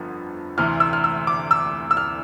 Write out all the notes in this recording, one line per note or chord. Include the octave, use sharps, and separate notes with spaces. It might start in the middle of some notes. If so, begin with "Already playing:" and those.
Already playing: G1 F2 D3 F3 B3
D2 C3 E3 F6
E6
F6
E6
D6
E6
E6
F6